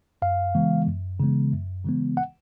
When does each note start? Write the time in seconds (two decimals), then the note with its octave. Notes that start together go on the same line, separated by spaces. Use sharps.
0.22 F#2 F5
0.55 C#3 E3 G#3 B3
0.87 F#2
1.20 C#3 E3 G#3 B3
1.53 F#2
1.85 C#3 E3 G#3 B3
2.17 F#5